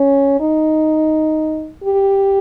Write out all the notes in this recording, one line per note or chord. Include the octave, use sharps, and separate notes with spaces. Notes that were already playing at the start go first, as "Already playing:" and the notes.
Already playing: C#4
D#4
G4